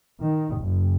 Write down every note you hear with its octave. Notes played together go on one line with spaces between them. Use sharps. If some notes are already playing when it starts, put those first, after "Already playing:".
D#3
F#1